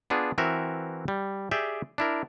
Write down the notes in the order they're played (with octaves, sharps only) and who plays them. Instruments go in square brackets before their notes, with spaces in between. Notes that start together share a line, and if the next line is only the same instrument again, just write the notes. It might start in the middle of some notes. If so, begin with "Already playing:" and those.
[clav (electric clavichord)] B3 D4 F4 G#4
E3 C4 F#4 A#4 E5
G3
G4 G#4 D5 E5 G5
D4 E4 A#4